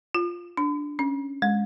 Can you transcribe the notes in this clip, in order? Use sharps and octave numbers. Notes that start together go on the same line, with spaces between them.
F4
D4
C#4
G#3